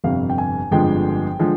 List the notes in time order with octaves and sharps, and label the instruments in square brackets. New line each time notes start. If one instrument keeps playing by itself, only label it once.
[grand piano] G1 F2 C3 F5
G5
G#5
G1 F2 D3 F3 G#3 G5
D3 F3 G#3